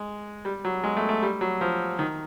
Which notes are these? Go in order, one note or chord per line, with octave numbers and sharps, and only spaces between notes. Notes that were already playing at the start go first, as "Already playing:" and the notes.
Already playing: G#3
G3
F#3
G#3
A3
A3
G3
F#3
F3
D#3